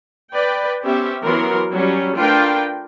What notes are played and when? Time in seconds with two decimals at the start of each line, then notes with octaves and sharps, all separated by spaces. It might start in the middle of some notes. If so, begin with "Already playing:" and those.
0.34 B4 D5 G5
0.83 B3 C#4 G4 C5 E5
1.23 E3 F#3 B3 A#4 C6
1.74 F#3 G3 C#4
2.17 A3 D4 F4 A#4 B4 G5